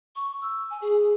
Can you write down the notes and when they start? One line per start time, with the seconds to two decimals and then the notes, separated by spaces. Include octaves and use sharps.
0.16 C#6
0.41 E6
0.70 G#5
0.82 G#4